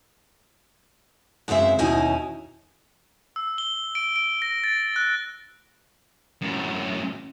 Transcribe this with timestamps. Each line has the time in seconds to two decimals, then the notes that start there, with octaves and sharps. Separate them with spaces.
1.48 F#2 C#3 G#3 C4 E5
1.79 D#2 B2 C#4 D#4 E4 G#5
3.36 E6
3.58 G7
3.95 D7
4.16 D7
4.42 A#6
4.64 A6
4.96 F#6
6.42 F#2 A2